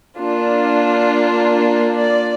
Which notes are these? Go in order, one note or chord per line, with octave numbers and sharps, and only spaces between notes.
A#3 D4 F4
D5